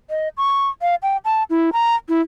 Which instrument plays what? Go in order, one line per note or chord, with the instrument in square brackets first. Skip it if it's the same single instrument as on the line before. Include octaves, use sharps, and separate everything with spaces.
[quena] D#5
C#6
F5
G5
A5
E4
A#5
E4